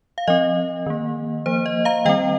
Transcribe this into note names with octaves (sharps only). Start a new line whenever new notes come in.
F5
F3 C4 D#5
D#3 A#3
F3 A#3 C5
D#5
F5 A#5
D#3 G3 C4 D#5 G5